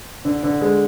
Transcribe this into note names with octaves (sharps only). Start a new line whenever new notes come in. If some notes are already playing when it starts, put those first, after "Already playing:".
D3
D3
G#3